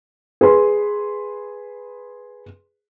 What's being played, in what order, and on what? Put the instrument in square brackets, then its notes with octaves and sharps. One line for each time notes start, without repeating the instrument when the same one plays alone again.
[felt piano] G#4 B4 C6